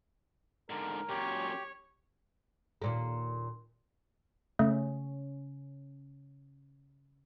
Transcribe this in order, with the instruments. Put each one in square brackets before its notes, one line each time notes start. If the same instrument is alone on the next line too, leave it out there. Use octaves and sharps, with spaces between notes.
[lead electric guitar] G#2 D3 [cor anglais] A#4
[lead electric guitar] F#2 A#2 [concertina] G4 [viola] C#5
[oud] D#2 A#2 A#3
[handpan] C#3 C#4 [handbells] A3